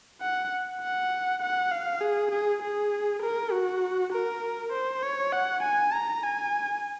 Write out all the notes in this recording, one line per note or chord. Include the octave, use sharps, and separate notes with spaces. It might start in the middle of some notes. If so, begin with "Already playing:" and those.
F#5
F#5
F#5
F5
G#4
G#4
G#4
A#4
F#4
A#4
C5
C#5
F#5
G#5
A#5
G#5